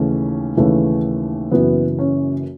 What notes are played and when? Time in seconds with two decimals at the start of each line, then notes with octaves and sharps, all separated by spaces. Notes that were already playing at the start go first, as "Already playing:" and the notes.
Already playing: D#2 C#3 E3 A3 C#4
0.57 D#2 C#3 E3 A3
1.51 F#1 F#2 E3 B3
1.99 C#4